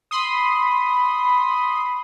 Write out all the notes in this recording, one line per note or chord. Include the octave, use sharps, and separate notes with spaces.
B5 C6 D#6